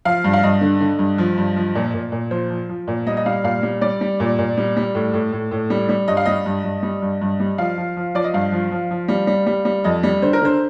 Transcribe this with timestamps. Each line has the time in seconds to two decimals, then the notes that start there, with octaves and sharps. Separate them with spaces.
0.05 F3 F5
0.24 G2
0.33 F5
0.43 G2 D#5
0.61 D3
0.81 D3
0.99 G2
1.18 F3
1.38 G2
1.56 F3
1.75 A#2
1.94 A#2
2.12 A#2
2.31 F3 C5
2.50 F3
2.69 F3
2.88 A#2
3.06 G3 D#5
3.17 D#5
3.26 G3 F5
3.44 A#2 F5
3.63 G3
3.81 G3 D5
4.01 G3
4.20 A#2
4.38 A#2
4.57 G3
4.77 G3
4.95 A2
5.13 A2
5.33 A2
5.51 A2
5.70 G3
5.89 G3
6.08 G2 D#5
6.17 F5
6.25 G3 D#5
6.46 G2
6.64 G2
6.83 G3
7.02 G2
7.21 G2
7.40 G3
7.58 F3 F5
7.78 F3
7.97 F3
8.15 F3 D5
8.24 D#5
8.34 G2 F5
8.52 F3
8.71 F3
8.91 F3
9.08 G3
9.27 G3
9.46 G3
9.65 G3
9.84 F2 D#5
10.03 G3
10.22 D3 C5
10.33 A#4
10.41 D3 C5